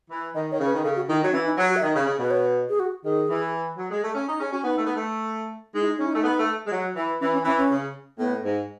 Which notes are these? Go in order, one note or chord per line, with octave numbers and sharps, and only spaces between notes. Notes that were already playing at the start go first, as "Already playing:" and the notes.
E3
D#3 D#5
D#3 C#5
C#3
B4
D#3
C#3 A4
F#4
D#3 E4
F#3 D#4
E3 C#4
D#4
F#3 F#4
F#4
E5
D#3 D#5
C#3
C#3
B2 B4
C#5
G#4
F#4
D#3 G#4
E3
F#3
G#3
A3
C#4
D#4
C#4 G#4
C#4 F#4
B3 D#4
A3
B3
A3
G#3 D#4
E4
D#4
C#4 D#4
E4
A3 D#4
B3
A3
G#3
F#3
E3
E3 C#4
C#4
E3 C#4
C#4
C#3
A2 B3
G#2